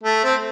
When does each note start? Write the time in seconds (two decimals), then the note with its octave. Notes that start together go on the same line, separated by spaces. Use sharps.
0.03 A3
0.24 C4